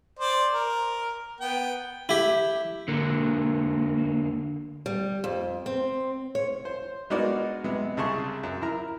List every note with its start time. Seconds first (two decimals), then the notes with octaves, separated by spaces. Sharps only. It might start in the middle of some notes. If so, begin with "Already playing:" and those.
0.19 C5 D5
0.54 A#4
1.41 B3 G5
2.09 E4 G4
2.88 D3 A#3
4.86 G3
5.24 F2
5.66 C4
6.35 C#5
6.65 C5
7.10 G#3 B3 D#4 F#4 A#4 D5
7.64 C3 G#3 B3
7.97 C2 C#3 G#4 A5 C6 C#6
8.43 F#2
8.62 E4 A#4 A#5